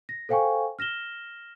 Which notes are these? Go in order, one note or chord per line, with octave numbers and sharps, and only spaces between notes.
A#6
A4 C5 F5 G5 G#5 C#6
F6 A#6 E7 G7